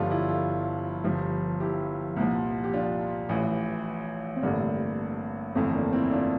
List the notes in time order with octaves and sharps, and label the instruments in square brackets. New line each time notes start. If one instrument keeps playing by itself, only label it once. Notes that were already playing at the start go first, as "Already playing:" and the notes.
Already playing: [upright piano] G1 G2 D3 F3 D4 F4
E4 G4
F4 A4
G1 G2 F3
E4 G4
C2 A#2 F3
G4
D4 F4
A1 A2 E3
C4
A1 G2 D3 A#3 D4
G1 F2 E3 A3 C4
A#3 D4
C4 E4
D4 F4